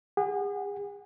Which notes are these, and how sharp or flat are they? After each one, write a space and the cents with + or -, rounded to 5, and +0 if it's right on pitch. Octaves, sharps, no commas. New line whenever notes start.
G#4 -40 F#5 +0